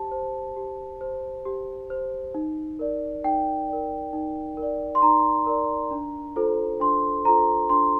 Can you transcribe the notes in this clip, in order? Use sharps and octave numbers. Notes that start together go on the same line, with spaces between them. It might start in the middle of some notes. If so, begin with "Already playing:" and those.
Already playing: G4 C5 A5
C5
G4
C5
G4
C5
D#4
A#4 D5
D#4 G5
A#4 D5
D#4
A#4
D5
C6
D#4 A#5
A#4 D5
D4
F4 A4 C5
D4 C6
F4 A4 C5 A#5
D4 C6